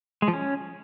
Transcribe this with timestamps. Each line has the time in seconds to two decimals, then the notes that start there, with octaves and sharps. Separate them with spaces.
0.22 G#3
0.28 F3
0.33 C#4